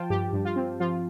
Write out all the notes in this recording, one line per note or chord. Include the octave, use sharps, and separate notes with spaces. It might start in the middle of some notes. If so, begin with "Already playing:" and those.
Already playing: F3 F4 G5 A5
G2 G4
G2
F4
C4
F3 F4